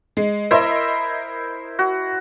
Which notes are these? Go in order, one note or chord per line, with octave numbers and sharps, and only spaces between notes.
G#3
E4 A#4 C5 D#5 E5
F#4